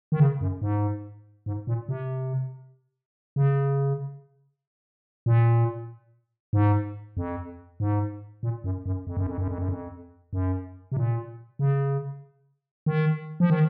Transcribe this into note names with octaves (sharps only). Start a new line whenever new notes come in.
D#3
C#3
F#2
G#2
G#2
A#2
C3
C#3
A#2
G#2
F2
G#2
A#2
F#2
F#2
F2
F#2
F2
F#2
F2
F#2
F2
F#2
C3
A#2
C#3
D#3
F3
D#3